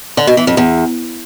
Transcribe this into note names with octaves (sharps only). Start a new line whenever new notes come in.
D3
B2
E3
F2
E2